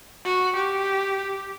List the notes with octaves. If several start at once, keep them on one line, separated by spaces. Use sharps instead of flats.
F#4
G4